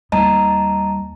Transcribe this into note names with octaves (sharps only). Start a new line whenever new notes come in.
D#2 G3 D#5 A5 A#5